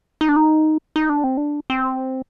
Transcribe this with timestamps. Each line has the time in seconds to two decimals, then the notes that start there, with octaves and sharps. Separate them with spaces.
0.21 D#4
0.29 D4
0.36 D#4
0.96 D#4
1.09 D4
1.24 C4
1.37 D4
1.70 C4